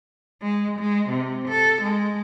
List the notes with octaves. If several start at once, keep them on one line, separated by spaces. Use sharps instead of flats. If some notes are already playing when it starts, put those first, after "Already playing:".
G#3
G#3
C3
A4
G#3